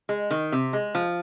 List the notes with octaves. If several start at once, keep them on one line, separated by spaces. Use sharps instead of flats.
G#3
D#3
C3
G#3
F3